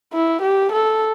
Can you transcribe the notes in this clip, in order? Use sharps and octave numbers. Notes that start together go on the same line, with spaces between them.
E4
G4
A4